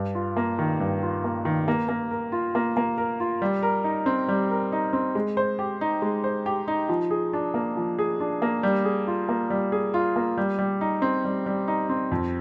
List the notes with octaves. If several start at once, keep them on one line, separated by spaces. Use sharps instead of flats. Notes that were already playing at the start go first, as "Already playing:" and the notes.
Already playing: G2
F4
A#3
D#3
G2
F4
A#3
D#3
A#3
A#3
A#4
F4
A#3
A#3
A#4
F4
G3
A#4
D#4
C4
G3
A#4
D#4
C4
G#3
C5
G4
D#4
G#3
C5
G4
D#4
F3
G#4
D4
A#3
F3
G#4
D4
A#3
G3
G#4
F4
A#3
G3
G#4
F4
A#3
G3
G3
D#4
C4
G3
G3
D#4
C4
F2